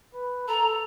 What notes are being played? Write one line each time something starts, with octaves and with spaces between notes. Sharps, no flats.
B4
A4 A#5